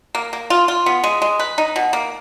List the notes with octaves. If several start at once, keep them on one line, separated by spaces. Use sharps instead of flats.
A#3
A#3
F4
F4
B3
G#3
G#3
B4
D#4
B2
A#3